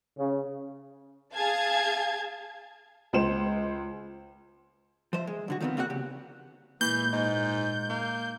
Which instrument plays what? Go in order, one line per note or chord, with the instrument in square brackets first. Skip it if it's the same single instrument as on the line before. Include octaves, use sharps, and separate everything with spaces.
[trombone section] C#3
[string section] G#4 F5 A5 G#6
[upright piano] C#2 C5 E7
[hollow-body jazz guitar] F3 C5 E5
G#3
C2 D3 F#4
D#3 F3 G3 B3 C4
A#3 C4 E4 F#4 F#5
C#3 G4
[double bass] A#2 G#3 [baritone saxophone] E3 [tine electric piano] A#3 [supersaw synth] G6
[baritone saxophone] G#2 [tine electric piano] D#5
[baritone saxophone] A#3